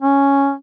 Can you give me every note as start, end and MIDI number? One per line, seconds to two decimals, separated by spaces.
0.02 0.53 61